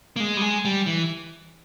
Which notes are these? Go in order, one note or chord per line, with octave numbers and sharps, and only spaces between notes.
A#3
G#3
G3
G#3
G3
E3